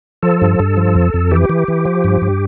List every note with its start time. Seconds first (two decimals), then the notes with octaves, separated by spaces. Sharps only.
0.23 F3 A4
0.41 G2
0.59 G2
0.77 F3
0.95 F2
1.14 F2
1.31 E3 G4
1.49 E3
1.68 E3
1.85 F3
2.04 G2
2.22 G2